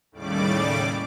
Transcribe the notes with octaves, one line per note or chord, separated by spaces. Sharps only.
D#2 A2 C#3 G3 D5 D6